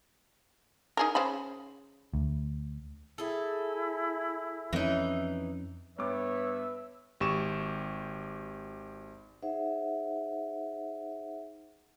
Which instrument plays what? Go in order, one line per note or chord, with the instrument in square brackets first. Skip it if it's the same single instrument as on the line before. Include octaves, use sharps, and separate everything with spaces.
[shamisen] D#4 G#4 A#4
C#3 C5 B5
[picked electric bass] D2
[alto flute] E4 [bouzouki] G#4 A4
[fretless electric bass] F2 B3 C#4 [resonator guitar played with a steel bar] E3 D#4
[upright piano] G2 B3 D6 [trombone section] B4 [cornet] C#5 [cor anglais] E5
[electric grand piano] G#1 G4 C#6 E7
[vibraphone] D#4 G#4 C5 E5 F#5